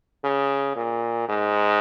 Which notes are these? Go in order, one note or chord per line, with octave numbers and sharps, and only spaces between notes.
C#3
A#2
G#2